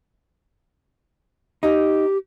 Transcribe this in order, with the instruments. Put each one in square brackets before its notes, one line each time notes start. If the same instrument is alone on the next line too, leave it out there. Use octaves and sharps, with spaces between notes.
[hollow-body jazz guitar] D#4 [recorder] G4